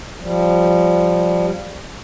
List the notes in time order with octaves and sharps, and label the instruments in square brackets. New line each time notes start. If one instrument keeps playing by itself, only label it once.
[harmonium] F3 G3